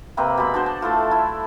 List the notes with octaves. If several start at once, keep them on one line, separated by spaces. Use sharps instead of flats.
C3 A#3 C4 B4
B2 G#3 B5
D4 F#4 C5
A5
A3 E4 F4 A4
E4